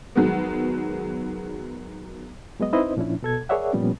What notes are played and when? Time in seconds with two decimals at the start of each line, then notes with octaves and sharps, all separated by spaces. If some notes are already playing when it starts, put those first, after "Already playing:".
0.16 D#3 F#3 G#3 B3
2.60 F#3 G#3 B3 D#5
2.73 C4 D#4 E4 B4 C5 D#5
2.97 A#2 F3 C#4 D4 E4
3.23 B2 A4 G#6
3.49 G#4 A#4 C#5 D5 E5 F#5
3.73 A#2 F3 G3 B3 C#4